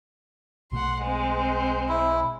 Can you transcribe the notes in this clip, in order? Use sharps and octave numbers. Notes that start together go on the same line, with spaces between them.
B1 B2 A3 F#5 C6
G#3 C4
E4